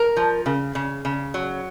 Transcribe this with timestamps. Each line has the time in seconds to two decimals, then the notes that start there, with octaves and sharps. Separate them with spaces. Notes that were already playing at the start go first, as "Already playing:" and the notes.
Already playing: A#4
0.17 F3
0.46 C#3
0.75 C#3
1.05 C#3
1.34 F#3